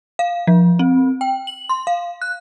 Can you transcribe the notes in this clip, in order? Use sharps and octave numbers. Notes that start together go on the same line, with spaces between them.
F5
F3
C4
G5
F#7
C6
F5
F#6